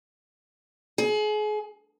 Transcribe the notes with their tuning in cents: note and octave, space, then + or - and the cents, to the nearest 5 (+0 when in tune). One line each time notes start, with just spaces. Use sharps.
G#4 +35